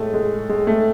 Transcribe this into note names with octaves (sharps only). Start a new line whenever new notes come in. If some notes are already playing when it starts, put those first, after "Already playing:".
Already playing: A2 G#3 A3
G#3
G#3
A3